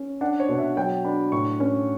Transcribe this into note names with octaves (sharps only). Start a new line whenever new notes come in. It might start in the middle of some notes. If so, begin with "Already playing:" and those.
Already playing: C#4
D4 F#5
C#5
B2
E5
F#3 G5
D4 B5
A2 C#6
C#4